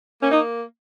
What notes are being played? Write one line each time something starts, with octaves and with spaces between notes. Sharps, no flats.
A#3 C#4
D#4